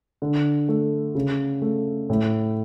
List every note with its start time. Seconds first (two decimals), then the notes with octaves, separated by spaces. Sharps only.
0.22 D3
0.69 A3
1.15 C#3
1.62 A3
2.10 A2